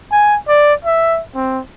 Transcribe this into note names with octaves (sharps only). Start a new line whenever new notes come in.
G#5
D5
E5
C4